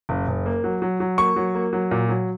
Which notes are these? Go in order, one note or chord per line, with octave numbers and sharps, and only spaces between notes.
F#1
F#1
A#3
F#3
F#3
F#3
A#3 C#6
F#3
A#3
F#3
A#2
F#3